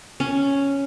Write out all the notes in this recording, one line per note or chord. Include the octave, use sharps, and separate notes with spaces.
C#4